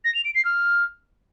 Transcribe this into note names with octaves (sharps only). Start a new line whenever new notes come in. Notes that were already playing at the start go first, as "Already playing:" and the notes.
A#6
F7
D7
C7
F6